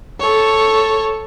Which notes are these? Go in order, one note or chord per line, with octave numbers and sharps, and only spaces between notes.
A4 C#5